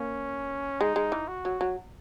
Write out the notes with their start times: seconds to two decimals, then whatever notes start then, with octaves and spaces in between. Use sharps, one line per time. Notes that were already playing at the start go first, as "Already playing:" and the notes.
Already playing: A#3 C#4
0.81 G#3 D#4
0.96 G#3
1.12 E3
1.28 F#4
1.45 F#3
1.61 F#3